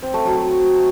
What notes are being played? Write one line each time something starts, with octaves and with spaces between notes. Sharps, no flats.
C4
A3
F#3